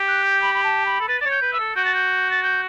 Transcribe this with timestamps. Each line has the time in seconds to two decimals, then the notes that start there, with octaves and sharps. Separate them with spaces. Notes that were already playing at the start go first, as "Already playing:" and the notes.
Already playing: G4
0.08 F#6
0.25 G6
0.42 B5
0.55 B5
0.64 A5
0.86 B5
1.00 A4
1.08 B4 A6
1.21 D5 A6
1.25 C#5
1.31 G6
1.42 B4
1.53 E6
1.59 A4
1.76 F#4 G6
1.85 A6
1.95 G6
2.31 A6
2.43 G6